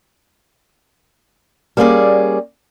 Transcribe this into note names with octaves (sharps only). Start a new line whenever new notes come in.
G3 A#3 B3 C#4 G#4 D5